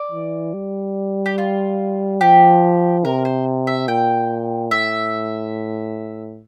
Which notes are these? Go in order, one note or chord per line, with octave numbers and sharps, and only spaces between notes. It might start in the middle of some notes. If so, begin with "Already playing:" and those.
Already playing: D5
E3
G3
G4
F4
F3 G4
C3 A#4
C5
E5
A#2 G5
A2 E5